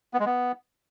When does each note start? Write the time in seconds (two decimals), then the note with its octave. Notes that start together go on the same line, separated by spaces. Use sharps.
0.14 B3
0.20 G#3
0.26 B3